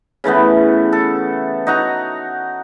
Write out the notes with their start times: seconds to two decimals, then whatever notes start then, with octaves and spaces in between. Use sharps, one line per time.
0.24 C#3 E3 A3 B3
0.93 A4
1.67 D#4 F#4 A#5